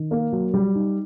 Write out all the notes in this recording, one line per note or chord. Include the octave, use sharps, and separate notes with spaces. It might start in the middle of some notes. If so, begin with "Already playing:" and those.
Already playing: D#3
A#3
F#3
G3
D#4